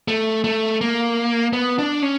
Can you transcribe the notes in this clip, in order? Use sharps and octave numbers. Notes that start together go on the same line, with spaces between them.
A3
A3
A#3
B3
D4
C#4